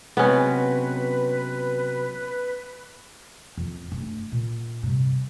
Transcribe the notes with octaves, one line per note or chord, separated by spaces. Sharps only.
C3 F#3 G#3 B3 C#4 B4
F2
G2 A3
A#2
G2 C3